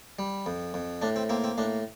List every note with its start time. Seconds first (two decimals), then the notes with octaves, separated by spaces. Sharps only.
0.19 G3
0.46 F2
0.74 F2
1.02 A2 D4
1.16 C4
1.29 A#3 C4
1.44 C4
1.58 A2 D4